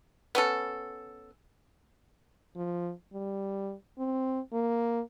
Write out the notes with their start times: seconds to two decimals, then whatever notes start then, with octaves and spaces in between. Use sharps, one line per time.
0.35 B3 C#4 A4
2.56 F3
3.13 G3
3.98 C4
4.53 A#3